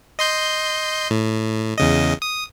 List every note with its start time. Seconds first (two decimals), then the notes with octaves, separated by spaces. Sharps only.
0.19 D#5 C6 G6
1.11 A2
1.78 E2 C#3 D#5
2.22 D#6